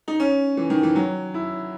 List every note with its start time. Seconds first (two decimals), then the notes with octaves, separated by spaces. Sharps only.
0.08 D#4
0.20 C#4
0.57 E3
0.70 D#3
0.83 E3
0.96 F#3
1.34 E4